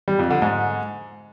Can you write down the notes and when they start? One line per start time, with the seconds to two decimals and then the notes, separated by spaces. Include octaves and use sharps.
0.08 G3
0.19 F2
0.30 D3
0.42 G#2